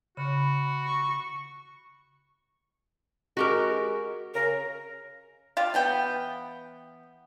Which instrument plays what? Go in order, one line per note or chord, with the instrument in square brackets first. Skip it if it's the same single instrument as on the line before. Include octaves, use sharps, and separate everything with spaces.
[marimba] C#3 [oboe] F#4 [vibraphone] B5
[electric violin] C#6
[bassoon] G#3 [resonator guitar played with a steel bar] F#4 G4 A#4
[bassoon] C#3 [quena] A#4
[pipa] F4 G4 F5
E3 B3 G5